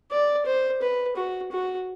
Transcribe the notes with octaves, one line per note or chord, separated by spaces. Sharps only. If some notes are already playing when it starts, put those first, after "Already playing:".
D5
C5
B4
F#4
F#4